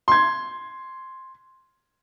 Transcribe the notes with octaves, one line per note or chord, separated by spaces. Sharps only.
C6 G#6